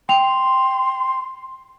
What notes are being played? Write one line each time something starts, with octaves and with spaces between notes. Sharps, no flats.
G5 C6 F7